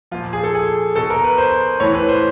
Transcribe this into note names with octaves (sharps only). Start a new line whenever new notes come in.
A#2 F3 F4
G#4
A4
G#4
B2 A4
A#4
B4
C5
A2 E3 C#5
B4
C5